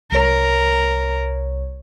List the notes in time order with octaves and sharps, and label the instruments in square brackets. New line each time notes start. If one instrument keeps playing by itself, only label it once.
[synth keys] C2 C#5 [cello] A#4